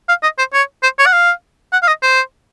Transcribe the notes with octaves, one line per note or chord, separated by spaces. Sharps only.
F5
D#5
C5
C#5
C5
C#5
F#5
F5
F#5
F5
D#5
C5